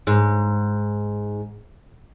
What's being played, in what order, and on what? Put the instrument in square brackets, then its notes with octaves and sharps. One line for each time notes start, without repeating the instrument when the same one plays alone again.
[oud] G#2